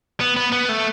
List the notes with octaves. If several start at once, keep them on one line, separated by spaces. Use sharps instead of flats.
B3
B3
B3
A3